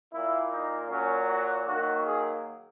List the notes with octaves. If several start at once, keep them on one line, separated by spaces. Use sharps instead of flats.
A#2 A#3 E4
D#4
A#2 F#3 A#3 C#4
F#4
D#3 F#3 A#3 F#4
G#4